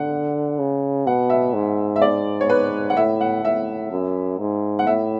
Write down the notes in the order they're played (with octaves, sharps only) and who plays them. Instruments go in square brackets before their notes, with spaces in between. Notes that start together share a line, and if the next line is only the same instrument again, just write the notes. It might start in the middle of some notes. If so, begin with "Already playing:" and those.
Already playing: [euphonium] D3 [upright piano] F#5
[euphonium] C#3
[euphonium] B2 [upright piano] F#5
[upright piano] E5
[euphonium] G#2
[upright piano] E5
D5
C#5
B4
F#5
[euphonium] A2 [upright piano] E5
[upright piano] F#5
[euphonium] A2 [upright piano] E5
[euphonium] F#2
G#2
[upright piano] F#5
[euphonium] A2 [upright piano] E5